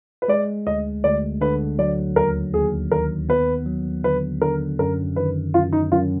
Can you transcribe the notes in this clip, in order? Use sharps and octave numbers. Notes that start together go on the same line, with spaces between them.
B4
G#3 D5
D2 D#5
D2 D5
D3 B4
F#3 D5
D#2 A#4
D#2 G#4
D#3 A#4
B3 B4
F#3
D3 B4
D3 A#4
F#2 A#4
D#3 B4
F#2 F4
D#4
F#2 F4